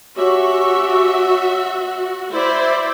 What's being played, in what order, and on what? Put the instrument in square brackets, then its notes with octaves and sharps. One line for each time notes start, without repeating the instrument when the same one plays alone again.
[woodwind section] C#4 G4 C#6 [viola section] F#4 E5
[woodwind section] E4 [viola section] C5 D5 E5